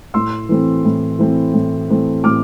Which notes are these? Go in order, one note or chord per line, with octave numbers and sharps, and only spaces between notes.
A2 C6 E6
E3 A3 C4
A2
E3 A3 C4
A2
E3 A3 C4
A2 D6 F6